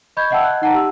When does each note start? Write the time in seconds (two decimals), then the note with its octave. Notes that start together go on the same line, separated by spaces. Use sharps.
0.17 D#5 B5 C#6 G6 G#6
0.30 D#5 E5 F#5 G5 A5 E6
0.44 F#6
0.62 D#4 F#5 A5 A#5
0.73 G4 E6